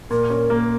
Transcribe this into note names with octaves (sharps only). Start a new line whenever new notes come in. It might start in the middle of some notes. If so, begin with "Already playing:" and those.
A#2 A#4
C#4
A#3